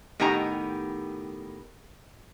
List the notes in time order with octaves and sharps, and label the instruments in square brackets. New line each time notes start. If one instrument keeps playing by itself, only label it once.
[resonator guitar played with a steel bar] A2 D#3 B3 G4 G#5 A#5